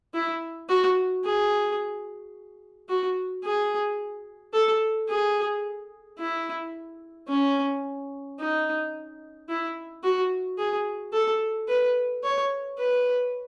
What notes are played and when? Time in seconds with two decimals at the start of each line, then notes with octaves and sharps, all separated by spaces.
0.14 E4
0.69 F#4
1.24 G#4
2.89 F#4
3.44 G#4
4.53 A4
5.09 G#4
6.19 E4
7.28 C#4
8.39 D#4
9.49 E4
10.03 F#4
10.58 G#4
11.13 A4
11.68 B4
12.23 C#5
12.78 B4